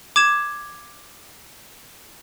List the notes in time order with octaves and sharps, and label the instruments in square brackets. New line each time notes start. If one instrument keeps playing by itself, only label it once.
[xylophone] D6 G#6 E7